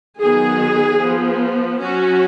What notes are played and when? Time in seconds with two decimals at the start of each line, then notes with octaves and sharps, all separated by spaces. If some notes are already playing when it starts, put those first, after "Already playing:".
0.20 D#3 F#3 B3 G#4
1.00 F3 B3
1.81 F#3 C#4 F#4